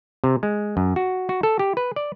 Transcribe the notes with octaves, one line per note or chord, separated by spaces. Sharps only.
C3
G#3
F#2
F#4
F#4
A4
G4
B4
D5